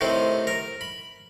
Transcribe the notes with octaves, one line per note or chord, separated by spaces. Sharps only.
A2 C3 D#3 C4
A#4
B5